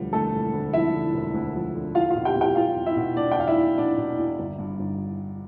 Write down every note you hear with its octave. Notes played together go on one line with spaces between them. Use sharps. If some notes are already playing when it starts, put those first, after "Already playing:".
Already playing: E1 D2 F3 G3
D3 A3 A4
E1
D2
F3 E4 E5
D3
E1
D2
F3
D3
E2 F4 F5
F4 F5
B2
G4 G5
B2
G4 G5
E2 F4 F5
E2
E4 E5
B2
B2 D4 D5
G5
E2 F5
E4 E5
E2
B2 D4 D5
B2
E2
G1
G2
G1